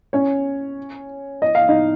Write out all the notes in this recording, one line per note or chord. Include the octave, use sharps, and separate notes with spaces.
C#4 C#5
D#5
F5
D#4 D#5